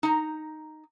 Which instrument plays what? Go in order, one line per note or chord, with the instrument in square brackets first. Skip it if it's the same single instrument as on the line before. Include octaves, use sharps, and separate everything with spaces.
[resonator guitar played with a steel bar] D#4 A#5